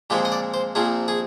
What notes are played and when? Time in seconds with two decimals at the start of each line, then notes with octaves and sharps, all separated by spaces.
0.10 A#2 F3 G#3 C4 G4
0.25 D#5
0.32 D5
0.54 C5
0.75 A#1 A#2 F3 C4 G#4
1.08 G#4